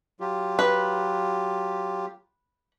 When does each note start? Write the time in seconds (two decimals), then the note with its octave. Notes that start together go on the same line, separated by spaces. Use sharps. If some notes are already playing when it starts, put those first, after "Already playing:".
0.20 F#3 F4 G4
0.59 B4